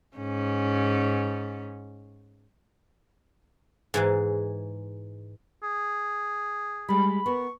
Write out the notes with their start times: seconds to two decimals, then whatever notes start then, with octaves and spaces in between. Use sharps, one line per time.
0.17 G#2 C#4
3.94 G#2 E3 G#3
5.63 G#4
6.89 G3 G#3 B5
7.26 B3 A#4 C#6